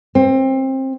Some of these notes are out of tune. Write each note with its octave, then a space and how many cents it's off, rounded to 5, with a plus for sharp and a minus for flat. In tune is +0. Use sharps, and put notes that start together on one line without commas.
C4 +25